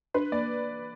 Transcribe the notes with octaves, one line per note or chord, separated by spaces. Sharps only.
D4 B4
A#3 D5